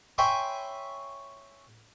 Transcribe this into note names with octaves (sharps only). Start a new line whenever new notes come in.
C#5 E5 G5 G#5 B5 C6